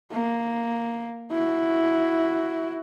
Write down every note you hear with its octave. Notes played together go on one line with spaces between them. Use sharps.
A#3
E4 F#4